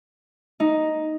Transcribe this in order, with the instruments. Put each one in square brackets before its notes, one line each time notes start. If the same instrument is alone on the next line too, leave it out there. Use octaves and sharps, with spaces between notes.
[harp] D#4